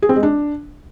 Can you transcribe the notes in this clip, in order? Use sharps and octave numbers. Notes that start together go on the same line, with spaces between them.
G#4
C4
G#3
D4